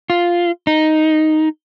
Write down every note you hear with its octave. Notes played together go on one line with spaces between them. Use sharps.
F4
D#4